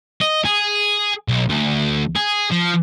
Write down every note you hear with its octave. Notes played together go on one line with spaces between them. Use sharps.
D#5
G#4
B1
D2
G#4
F3